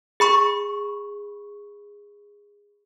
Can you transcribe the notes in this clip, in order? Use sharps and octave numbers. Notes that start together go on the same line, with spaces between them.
G#4 B5 C#6